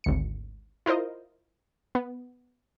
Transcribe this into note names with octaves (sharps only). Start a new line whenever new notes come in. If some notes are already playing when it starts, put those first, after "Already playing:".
G#1 D2 C#7
E4 F4 A#4 C5 D#5
B3